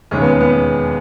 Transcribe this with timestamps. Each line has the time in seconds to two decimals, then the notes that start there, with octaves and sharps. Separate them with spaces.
0.11 E1 D#2 C#3 G#3 C#4
0.21 B3
0.41 B3